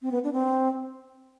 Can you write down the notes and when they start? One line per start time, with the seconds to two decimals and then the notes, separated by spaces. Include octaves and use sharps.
0.02 C4
0.11 B3
0.24 D4
0.33 C4